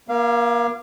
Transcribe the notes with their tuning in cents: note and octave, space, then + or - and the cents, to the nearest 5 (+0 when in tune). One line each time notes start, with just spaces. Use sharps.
A#3 +30 F5 -25